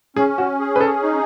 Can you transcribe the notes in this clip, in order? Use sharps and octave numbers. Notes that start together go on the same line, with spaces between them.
C#4 G#4
F#4
G#4
B4
A4
D#4